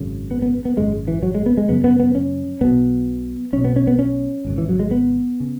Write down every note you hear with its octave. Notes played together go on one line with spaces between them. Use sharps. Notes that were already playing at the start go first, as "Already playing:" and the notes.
Already playing: G#1 F#2 C#3
B3
B3
B3
G#1 F#2 C#3 G#3
E3
F#3
G#3
B3
G#3
F#1 F#2 C#3 B3
B3
B3
C#4
B1 B2 B3
B1 B2 C#4
B3
C#4
B3
C#4
G#1 F#2 C#3
E3
F#3
G#3
B3
C#3